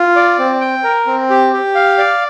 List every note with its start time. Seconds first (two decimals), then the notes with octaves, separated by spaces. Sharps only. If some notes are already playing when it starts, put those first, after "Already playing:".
Already playing: F4
0.16 D5
0.39 C4
0.61 G5
0.84 A#4
1.06 C4
1.30 G4
1.53 G4
1.75 F5
1.98 D5